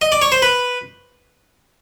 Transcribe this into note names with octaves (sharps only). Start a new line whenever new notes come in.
D#5
D5
C#5
C5
B4